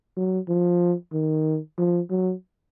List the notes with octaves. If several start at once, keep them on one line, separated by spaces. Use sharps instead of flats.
F#3
F3
D#3
F3
F#3